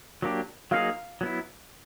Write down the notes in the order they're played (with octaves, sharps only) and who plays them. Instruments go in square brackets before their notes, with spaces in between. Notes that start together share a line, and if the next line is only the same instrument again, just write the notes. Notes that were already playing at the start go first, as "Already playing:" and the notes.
[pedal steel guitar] F#3 A#3 D4 G4
[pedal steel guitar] F#3 A#3 D#4 G#4 [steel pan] F5
[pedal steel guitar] F#3 B3 E4